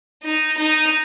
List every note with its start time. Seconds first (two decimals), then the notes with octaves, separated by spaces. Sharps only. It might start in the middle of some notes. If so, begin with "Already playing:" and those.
0.23 D#4
0.57 D#4